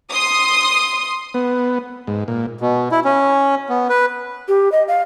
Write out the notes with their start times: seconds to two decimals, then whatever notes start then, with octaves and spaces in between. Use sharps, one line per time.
0.10 C6 D#6
1.34 B3
2.07 G#2
2.28 A#2
2.61 B2
2.91 E4
3.05 C#4
3.69 B3
3.90 B4
4.48 G4
4.72 D#5
4.88 F5